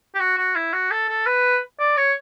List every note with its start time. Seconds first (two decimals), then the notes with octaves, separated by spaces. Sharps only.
0.15 G4
0.20 F#4
0.38 F#4
0.55 E4
0.73 F#4
0.91 A4
1.09 A4
1.26 B4
1.80 D5
1.97 C#5